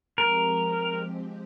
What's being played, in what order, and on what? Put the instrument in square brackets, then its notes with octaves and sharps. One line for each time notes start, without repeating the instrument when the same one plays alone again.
[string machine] F3 G#3 C4 G4 [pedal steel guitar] A#4